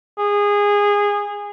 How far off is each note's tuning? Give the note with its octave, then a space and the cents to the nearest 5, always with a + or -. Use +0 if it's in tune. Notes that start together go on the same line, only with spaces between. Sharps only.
G#4 -20